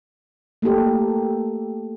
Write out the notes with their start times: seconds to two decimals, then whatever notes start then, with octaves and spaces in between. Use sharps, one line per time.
0.62 A3 A#3 E4 G4 A4